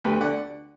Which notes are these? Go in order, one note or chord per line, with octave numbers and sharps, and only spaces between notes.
D2 G4 B4
D3 D5 F#5